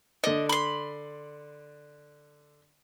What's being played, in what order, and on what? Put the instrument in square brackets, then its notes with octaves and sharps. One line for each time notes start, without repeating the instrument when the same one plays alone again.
[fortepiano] D3 D5 [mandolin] D#5
[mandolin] B5 C6